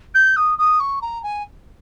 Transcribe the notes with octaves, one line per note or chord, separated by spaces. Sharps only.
G6
D#6
D#6
C#6
A#5
G#5